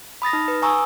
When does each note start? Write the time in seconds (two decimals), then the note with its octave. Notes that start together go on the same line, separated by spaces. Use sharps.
0.22 B5 D#6 A6 A#6
0.33 D#4
0.48 B4
0.62 G#5 A#5 C#6 D#6 E6